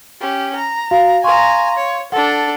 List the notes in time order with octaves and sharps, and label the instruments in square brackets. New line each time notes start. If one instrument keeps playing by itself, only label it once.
[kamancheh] C#4 G4
A#5
[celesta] F#4 F5
[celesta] F5 C6 C#6 [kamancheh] G#5 A#5
[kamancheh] C#5
[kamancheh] D4 A4 [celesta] F#5